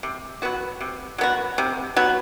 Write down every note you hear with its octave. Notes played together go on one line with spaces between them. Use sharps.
C3
F#3 B3 F#4
C3
F#3 B3 F#4
C3
F#3 B3 F#4